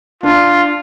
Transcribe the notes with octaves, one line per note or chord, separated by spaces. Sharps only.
D4 F4